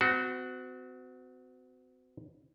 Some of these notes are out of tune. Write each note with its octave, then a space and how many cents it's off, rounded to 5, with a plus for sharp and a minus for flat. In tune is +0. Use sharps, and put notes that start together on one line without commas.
C4 -40 F#4 +0